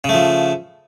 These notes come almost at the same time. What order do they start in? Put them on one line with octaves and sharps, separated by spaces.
C#3 A3 F3